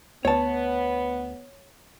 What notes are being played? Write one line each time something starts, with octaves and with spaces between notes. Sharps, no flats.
D2 B3 C#5 A5